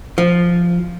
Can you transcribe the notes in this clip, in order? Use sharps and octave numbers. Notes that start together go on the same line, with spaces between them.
F3